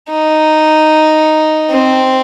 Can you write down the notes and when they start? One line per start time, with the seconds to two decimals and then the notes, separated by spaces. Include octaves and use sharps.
0.10 D#4
1.70 C4